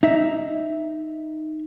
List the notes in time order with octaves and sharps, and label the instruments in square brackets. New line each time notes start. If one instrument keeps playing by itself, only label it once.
[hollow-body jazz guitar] D#4 E5